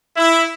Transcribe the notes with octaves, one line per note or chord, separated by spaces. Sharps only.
E4